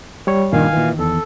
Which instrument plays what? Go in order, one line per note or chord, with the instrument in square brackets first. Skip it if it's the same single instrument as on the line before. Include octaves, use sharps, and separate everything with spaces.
[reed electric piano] G3 C#5
[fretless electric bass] A#1 G2 A#2 [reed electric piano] D#3 [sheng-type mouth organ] F5 G#5
[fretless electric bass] A#2 E3
[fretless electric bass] E2 [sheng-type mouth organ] A4